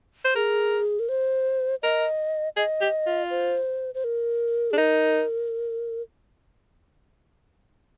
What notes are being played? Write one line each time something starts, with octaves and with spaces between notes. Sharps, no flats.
C5
G#4 A#4
A#4
C5
A#4 D#5
G#4 D#5
G4
F4
C5
C5
A#4
D4 G#4
D#4 A#4